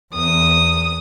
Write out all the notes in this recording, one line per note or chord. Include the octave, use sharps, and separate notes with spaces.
E2 D#6